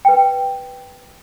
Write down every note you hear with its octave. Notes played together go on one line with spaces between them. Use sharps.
B4 G5